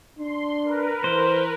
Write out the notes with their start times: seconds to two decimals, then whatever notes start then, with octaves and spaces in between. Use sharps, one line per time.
0.19 D4 C6
0.64 A#4 B4
1.04 E3 C5